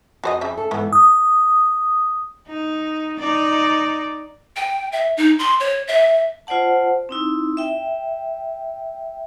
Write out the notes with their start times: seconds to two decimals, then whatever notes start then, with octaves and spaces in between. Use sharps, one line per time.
0.24 F2 F#4 C5 D#5
0.41 C#3 E5
0.57 A4
0.71 G#2 E3 A3 B3
0.93 D#6
2.48 D#4
3.19 D#4 D5
4.56 G5
4.92 E5
5.17 D#4
5.39 C6
5.60 C#5
5.88 E5
6.47 F4 C5 D5 F#5 A5
7.09 C4 D#4 E4
7.57 E5 G5